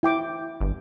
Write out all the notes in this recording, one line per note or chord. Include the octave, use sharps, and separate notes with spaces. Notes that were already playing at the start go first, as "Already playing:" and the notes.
E4 G5 D6
G1